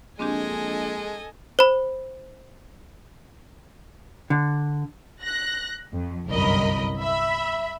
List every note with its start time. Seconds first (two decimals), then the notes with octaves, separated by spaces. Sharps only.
0.19 A#1 G#3 C4 D4 G4 A4 D#5 G#5
1.59 C5 B5
4.30 D3
5.23 F#6 A#6
5.93 F2
6.27 G1 C2 F#2 A#4 D#5 B5
6.99 E5 B5